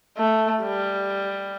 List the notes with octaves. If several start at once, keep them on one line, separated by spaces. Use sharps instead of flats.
A3
G3